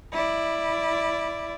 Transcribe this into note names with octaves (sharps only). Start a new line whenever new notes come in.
E4 D5